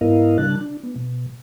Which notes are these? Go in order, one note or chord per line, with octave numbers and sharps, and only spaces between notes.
G#2 B3 E4 A#4 D#5 F5
C#3 G3 D4 A5 F#6
D4
B3
B2